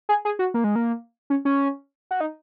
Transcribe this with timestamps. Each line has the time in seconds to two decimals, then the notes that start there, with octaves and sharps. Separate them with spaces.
0.09 G#4
0.25 G#4
0.39 F#4
0.54 A#3
0.64 G#3
0.76 A#3
1.30 C#4
1.45 C#4
2.11 F#4
2.21 D#4